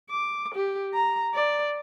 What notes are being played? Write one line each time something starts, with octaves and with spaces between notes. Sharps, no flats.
D6
G4
A#5
D5